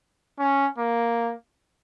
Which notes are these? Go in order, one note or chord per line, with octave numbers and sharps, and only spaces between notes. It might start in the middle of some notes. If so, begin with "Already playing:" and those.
C#4
A#3